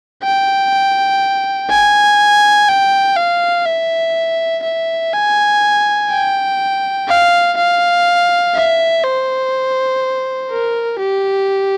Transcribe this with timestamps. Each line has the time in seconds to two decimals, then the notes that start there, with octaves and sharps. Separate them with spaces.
0.23 G5
1.70 G#5
2.68 G5
3.17 F5
3.66 E5
4.64 E5
5.13 G#5
6.10 G5
7.08 F5
7.57 F5
8.55 E5
9.04 C5
10.51 A#4
10.99 G4